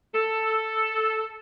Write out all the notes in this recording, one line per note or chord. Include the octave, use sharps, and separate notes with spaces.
A4